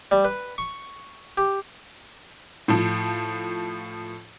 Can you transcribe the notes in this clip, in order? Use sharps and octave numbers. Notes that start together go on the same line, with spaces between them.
G3
B4
C#6
G4
A2 F3